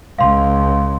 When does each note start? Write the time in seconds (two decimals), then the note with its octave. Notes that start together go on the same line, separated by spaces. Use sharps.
0.19 C#2 F5 C6